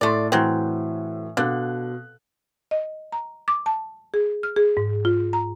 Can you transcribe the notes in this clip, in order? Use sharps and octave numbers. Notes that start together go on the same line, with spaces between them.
A2 A3 D5 C6
A2 E3 F#3 C4
B2 D3 F5 F#6
D#5
A#5
D6
A5
G#4
F6
G#4
G#2
F4
A#5